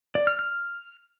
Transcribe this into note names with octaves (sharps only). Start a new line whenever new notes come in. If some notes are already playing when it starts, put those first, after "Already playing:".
D5
F6
F6